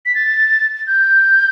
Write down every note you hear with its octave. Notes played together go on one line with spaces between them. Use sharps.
B6
A6
G6